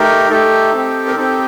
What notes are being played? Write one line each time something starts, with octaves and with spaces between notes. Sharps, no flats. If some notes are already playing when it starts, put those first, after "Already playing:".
Already playing: A3 D#4 G4 A#4
A3 D#4 G4 A4
C4 D#4 G4
A#4
C4 D#4 G4 A4